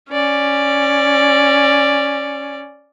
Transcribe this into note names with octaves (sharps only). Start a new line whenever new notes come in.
C#4 D5